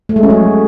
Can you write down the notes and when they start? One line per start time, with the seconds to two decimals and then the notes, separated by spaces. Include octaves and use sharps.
0.09 A3
0.16 G#3
0.23 C#4
0.30 F#3